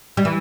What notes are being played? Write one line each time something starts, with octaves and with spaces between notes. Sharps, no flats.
G3
E3